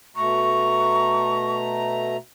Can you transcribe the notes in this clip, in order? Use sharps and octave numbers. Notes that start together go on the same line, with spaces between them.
B2 A3 A#5 C#6